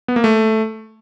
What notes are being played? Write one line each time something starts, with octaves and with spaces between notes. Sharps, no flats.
B3
A#3
A3